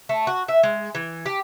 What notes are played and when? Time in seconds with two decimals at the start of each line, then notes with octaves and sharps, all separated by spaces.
0.09 A3
0.27 F#4
0.48 E5
0.63 G#3
0.95 E3
1.26 G4